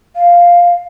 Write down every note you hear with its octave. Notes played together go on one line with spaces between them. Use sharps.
F5